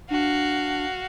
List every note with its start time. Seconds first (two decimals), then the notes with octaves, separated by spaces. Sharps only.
0.10 D4 F#4 F5